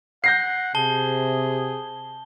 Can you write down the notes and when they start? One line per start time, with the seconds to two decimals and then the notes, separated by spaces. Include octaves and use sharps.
0.24 F#5 G6 A#6 C7
0.75 C3 G#4 A5 G7